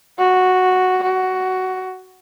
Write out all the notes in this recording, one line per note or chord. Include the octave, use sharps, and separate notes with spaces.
F#4
F#4